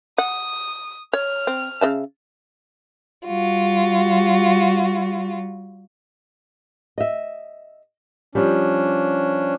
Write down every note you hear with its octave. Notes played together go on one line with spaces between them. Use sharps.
F#5 D#6
C#5 F6
C4
C#3 E5 A5
G3 F4 F#4
D#5 E5
F3 G3 C#4 D4